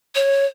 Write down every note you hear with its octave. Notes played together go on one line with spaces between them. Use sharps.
C#5